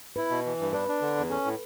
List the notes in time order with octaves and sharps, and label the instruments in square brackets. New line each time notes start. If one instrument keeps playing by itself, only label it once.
[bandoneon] E4 [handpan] B4
[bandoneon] B2
E3
G2
[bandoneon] D4 [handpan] B4
[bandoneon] D4
D3
E2
[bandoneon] C#4 [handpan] A4
[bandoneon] A2